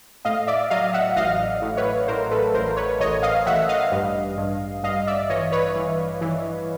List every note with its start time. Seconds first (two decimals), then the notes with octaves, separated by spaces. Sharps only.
0.25 A2 D#5 F5
0.47 D5 E5
0.70 F#3 D#5 F5
0.93 E5 F#5
1.16 A1 D#5 F5
1.62 A2
1.77 B4 C#5
2.08 A2 A#4 C5
2.31 A4 B4
2.54 A1 A#4 C5
2.77 B4 C#5
3.00 A1 C#5 D#5
3.23 D#5 F5
3.47 A1 E5 F#5
3.69 D#5 F5
3.92 G2
4.37 G2
4.83 G2 D#5 F5
5.07 D5 E5
5.29 E3 C#5 D#5
5.52 B4 C#5
5.76 E3
6.21 E3